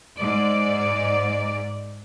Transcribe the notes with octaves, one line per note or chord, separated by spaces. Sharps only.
G#2 D5